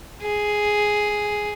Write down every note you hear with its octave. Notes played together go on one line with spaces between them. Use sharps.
G#4